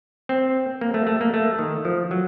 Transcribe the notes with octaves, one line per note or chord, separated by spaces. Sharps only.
C4
A#3
A3
A3
A#3
A3
D#3
F3
F#3